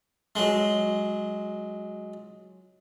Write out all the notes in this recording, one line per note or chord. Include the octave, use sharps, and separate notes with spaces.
F#3 G#3